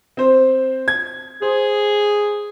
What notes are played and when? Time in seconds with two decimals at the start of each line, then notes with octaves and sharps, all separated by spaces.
0.17 C4 C5
0.88 G#6
1.42 G#4 C5